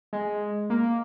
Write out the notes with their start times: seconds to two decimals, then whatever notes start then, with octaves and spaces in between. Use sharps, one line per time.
0.13 G#3
0.70 A#3